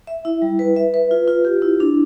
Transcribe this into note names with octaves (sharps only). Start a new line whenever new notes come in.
E5
E4
G3
B4
E5
B4
F4
F4
G4
E4
D4